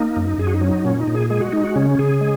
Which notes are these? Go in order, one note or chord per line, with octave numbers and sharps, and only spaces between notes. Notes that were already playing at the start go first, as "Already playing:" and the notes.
Already playing: A#3 D#4
F#2
F#2 G#4
F#4
D#4
F#3 C#4
D#4
A#2 C#4
D#4
A#2
G#4
G#3 G#4
F#4
G#3 D#4
F#4
C#3 C#4
C#3 G#4
G#3